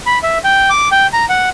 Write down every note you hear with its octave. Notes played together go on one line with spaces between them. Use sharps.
B5
E5
G5
D6
G5
A#5
F#5